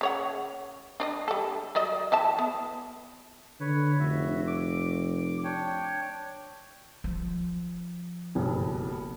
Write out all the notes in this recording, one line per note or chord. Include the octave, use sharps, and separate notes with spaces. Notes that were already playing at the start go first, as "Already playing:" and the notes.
C#3 C#5 F#5
D4 D5 D#5
G3 A4
F#3 D5 D#5
E3 E5 A5
B3
D3 B4 C#5
F1 F#4 E5
D6
D4 C#5 G5
F3
F#1 B1 G2